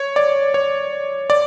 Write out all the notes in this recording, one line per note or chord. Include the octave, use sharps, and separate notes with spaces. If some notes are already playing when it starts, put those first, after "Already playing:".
Already playing: C#5
D5
C#5
D5